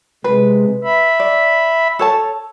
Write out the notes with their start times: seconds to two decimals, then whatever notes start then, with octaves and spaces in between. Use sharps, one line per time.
0.24 C3 G#3 B4
0.84 E5 B5
1.20 D5
1.99 A4 C#5 A5